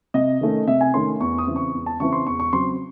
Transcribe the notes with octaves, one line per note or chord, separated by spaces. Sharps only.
C3 D#5
D#3 A3 C#4
C3 E5
G#5
D#3 A3 C#4 C6
E2 C#6
D#6
C#3 E3 C4
C#6
E2
A5
C#3 E3 C4 C#6
C6
E2 C#6
C#6
C#3 F#3 C4 C6